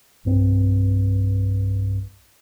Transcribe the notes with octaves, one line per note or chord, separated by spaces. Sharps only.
B1 G2 C4